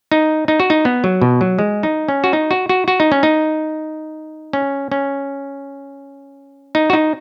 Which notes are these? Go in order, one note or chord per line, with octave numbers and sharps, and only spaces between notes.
D#4
D#4
F#4
D#4
B3
F#3
B2
F#3
G#3
D#4
C#4
F#4
D#4
F#4
F#4
F#4
D#4
C#4
D#4
C#4
C#4
D#4
F#4
D#4